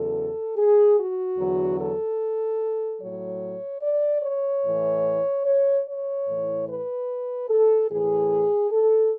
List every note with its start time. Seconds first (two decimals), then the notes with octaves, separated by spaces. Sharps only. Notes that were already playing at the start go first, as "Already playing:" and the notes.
Already playing: E2 C#3 F#3 A4
0.57 G#4
0.97 F#4
1.37 E2 D3 F#3
1.78 A4
3.01 A2 F#3 C#5
3.81 D5
4.22 C#5
4.64 A2 E3
5.45 C#5
5.86 C#5
6.27 A2 E3
6.67 B4
7.48 A4
7.89 A2 E3 G#4
8.71 A4